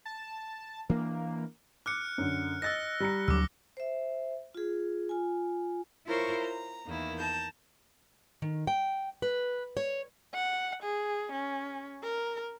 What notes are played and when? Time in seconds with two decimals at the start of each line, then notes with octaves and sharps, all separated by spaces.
0.06 A5
0.89 E3 A#3 D4
1.86 D6 F6 F#6 C#7
2.18 F#2 D3
2.62 D#5 E6 F#6 A6 A#6
3.00 G3 A#5 C#7
3.28 D2 D3 F#3 D6 E6
3.77 C5 E5
4.55 F4 G#4
5.09 F4 G#5
6.07 E4 F4 A#4 C5 C#5 C#6
6.41 A#5
6.85 E2 D#3 A#3 E4
7.18 A5 A#5 G6
8.42 D#3
8.67 G5
9.22 B4
9.77 C#5
10.34 F#5
10.83 G#4
11.32 C#4
12.03 A#4